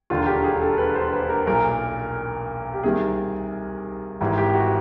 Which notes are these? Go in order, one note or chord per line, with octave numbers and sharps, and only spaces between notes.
E1 D#2 D3 F4
G4
G#4
A4
B4
C5
B4
A#4
B1 A#2 A#4
G4
C2 C3 D#3 G#4
G#1 G#2 E3 G4
G4
F#4